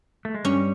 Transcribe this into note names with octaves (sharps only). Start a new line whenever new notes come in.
A3
G#3
G2 G3 C#4